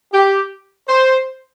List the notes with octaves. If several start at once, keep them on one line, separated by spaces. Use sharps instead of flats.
G4
C5